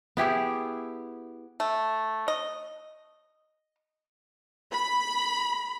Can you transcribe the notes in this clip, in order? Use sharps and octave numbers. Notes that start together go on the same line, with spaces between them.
B3 E4 G4 G#4
A3
D#5
B5